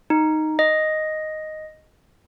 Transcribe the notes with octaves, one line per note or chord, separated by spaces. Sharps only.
D#4
D#5